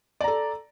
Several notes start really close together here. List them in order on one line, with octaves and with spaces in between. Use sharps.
D5 A#5 A4